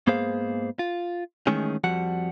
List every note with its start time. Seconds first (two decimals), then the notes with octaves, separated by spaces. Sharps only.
0.07 G#2 A#3 B3 G#4 C5 F5
0.79 F4
1.47 D#3 E3 G#3 A3 C#4 G#4
1.84 F2 F3 G3 F#4 F#5